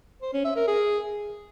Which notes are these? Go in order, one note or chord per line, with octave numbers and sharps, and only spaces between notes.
C5
C#4
E5
A#4
G#4